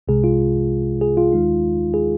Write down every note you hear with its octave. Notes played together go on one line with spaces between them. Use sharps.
C2 C3 G#3 G#4
F4
G#4
F4
D#2 D#3 G#3 D#4
G#4